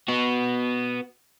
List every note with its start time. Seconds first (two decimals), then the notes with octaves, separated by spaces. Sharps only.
0.08 B3 F#4